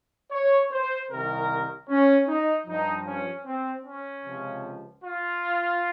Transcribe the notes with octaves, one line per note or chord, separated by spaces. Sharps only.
C#5
C5
C2 C3 D#3 A#4
C#4
D#4
G2 F3 D#4
C#4
C4
C#4
C#2 C3 F3
F4